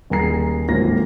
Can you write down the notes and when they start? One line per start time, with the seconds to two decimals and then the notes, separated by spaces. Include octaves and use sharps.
0.10 D#1 G#4 A#5 C7
0.68 D1 G#1 F3 A#3 C#4 A#6